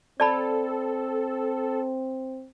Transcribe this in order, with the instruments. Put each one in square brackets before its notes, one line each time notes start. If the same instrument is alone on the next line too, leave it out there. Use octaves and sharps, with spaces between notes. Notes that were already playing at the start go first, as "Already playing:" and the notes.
[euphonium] C4 [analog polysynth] A4 [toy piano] D5 A5 B5